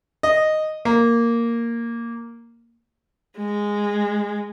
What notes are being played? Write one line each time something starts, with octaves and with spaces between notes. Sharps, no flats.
D#5
A#3
G#3